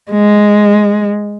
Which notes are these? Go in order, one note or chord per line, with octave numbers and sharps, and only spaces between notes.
G#3